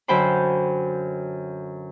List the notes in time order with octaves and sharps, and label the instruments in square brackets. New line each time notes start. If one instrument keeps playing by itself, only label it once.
[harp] F#2 D3 C5 G5 B5